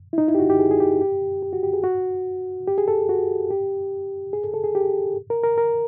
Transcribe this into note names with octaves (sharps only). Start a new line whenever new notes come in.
E4
D#4
E4
G4
F#4
G4
G#4
G#4
G4
G4
G4
F#4
G4
G#4
F#4
G4
G#4
A4
F#4
G4
G#4
A4
A4
G#4
G4
A#4
A#4
A#4